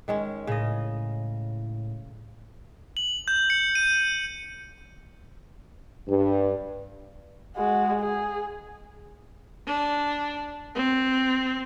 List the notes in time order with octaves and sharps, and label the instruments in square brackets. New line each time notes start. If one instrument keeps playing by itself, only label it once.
[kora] D#3 G#3 C#4
[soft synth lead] A2 [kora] C#3 D#5
[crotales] F#7
G6
C#7
D#7
[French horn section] G2
[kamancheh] G#3 F#4
G#4
[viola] D4
C4